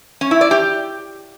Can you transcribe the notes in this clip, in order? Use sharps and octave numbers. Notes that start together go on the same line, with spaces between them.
C#4
E4
D5
G4